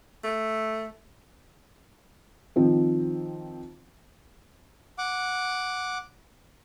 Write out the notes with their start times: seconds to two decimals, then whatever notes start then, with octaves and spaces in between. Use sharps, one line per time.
0.24 A3
2.56 D#3 F3 C4
4.98 F#5 D6